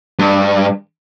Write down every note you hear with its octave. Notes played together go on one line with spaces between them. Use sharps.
G2